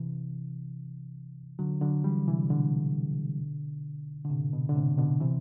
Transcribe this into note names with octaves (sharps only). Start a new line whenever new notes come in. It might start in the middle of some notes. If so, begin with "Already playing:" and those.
Already playing: C3 E3
D3 F#3
D3 F#3
E3 G3
C3 E3
B2 D3
D3
A2 C3
B2
D3
A2 C3
B2 D3
C3 E3